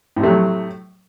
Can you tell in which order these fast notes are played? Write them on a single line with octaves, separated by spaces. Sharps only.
A2 C3 A3 F#3